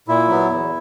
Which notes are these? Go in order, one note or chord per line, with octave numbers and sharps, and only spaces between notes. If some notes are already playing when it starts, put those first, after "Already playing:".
A#2 E4
F#3 B3
E2